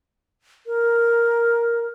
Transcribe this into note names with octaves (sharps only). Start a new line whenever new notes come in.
A#4